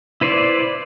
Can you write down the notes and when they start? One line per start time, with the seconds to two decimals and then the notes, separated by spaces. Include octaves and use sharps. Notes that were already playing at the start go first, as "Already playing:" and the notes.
0.21 E4 B4 C5 D5